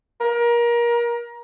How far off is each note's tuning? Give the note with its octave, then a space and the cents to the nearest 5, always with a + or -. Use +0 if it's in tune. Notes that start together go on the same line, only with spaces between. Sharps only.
A#4 +25